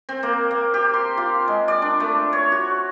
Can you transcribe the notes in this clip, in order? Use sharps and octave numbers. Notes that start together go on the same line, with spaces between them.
C4
A#3
A#3
G4
C6
F4
G#3
D5
D4
A3
C#5
F#4